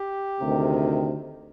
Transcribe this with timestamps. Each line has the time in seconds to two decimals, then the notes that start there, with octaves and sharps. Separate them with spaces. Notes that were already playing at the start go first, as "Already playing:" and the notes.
Already playing: G4
0.39 D2 C3 D#3